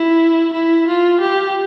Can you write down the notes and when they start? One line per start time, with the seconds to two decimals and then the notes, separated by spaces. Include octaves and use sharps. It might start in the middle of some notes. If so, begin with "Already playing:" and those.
Already playing: E4
0.53 E4
0.88 F4
1.21 G4